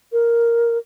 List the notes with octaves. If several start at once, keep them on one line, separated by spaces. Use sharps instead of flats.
A#4